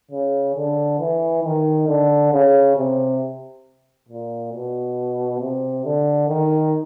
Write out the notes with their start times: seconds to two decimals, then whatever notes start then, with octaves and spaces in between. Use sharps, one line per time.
0.11 C#3
0.56 D3
0.99 E3
1.44 D#3
1.88 D3
2.32 C#3
2.77 C3
4.09 A#2
4.52 B2
5.40 C3
5.85 D3
6.28 D#3